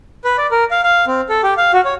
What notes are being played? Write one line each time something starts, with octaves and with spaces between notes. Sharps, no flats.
B4
D5
A#4
F5
F5
C4
A4
G4
F5
F#4
C#5